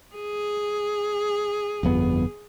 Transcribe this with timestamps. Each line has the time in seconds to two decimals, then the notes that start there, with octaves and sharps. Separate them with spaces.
0.15 G#4
1.83 G1 F2 B3